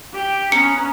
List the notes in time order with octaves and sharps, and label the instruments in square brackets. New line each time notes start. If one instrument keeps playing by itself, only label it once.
[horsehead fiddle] G4
[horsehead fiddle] B3 C#4 [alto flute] A#5 [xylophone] C#7